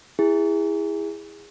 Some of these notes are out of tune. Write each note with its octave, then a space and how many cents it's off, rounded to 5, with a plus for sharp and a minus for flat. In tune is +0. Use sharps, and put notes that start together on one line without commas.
E4 +0 G#4 -20